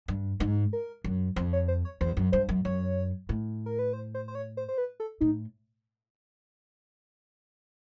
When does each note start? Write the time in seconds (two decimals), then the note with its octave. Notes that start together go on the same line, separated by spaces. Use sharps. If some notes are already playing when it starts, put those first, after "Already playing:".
0.08 G2
0.40 G#2
0.73 A#4
1.04 F#2
1.36 F2 C5
1.53 C#5
1.68 C5
1.85 C#5
2.01 E2 C5
2.17 F#2
2.32 G2 C5
2.49 F#2
2.65 F#2 C#5
3.29 A2
3.66 A#4
3.79 B4
3.93 C5
4.14 C5
4.28 C5
4.35 C#5
4.57 C5
4.68 C5
4.78 B4
5.00 A4
5.21 A2 D#4